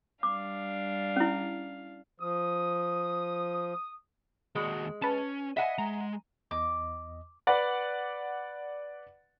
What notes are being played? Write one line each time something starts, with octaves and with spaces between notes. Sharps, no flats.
G3 D4 F5 D6
C#4 E4
F3 D#6
D#2 G#3 F#4
C#4 B4 A5
D#5 E5 F#5 G#5
G#3 A#5
E2 D#5 D6
B4 D5 F#5